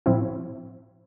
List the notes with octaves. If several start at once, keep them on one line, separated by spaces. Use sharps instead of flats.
A2 F3 C4 E4